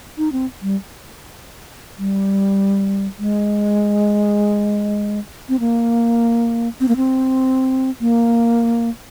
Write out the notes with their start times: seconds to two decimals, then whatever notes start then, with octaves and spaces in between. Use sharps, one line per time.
0.18 D#4
0.32 C4
0.62 G3
1.98 G3
3.19 G#3
5.49 C4
5.60 A#3
6.80 C4
6.88 A#3
6.97 C4
8.01 A#3